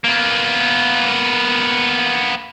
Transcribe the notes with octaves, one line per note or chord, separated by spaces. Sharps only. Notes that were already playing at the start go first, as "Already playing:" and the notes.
A#3 B3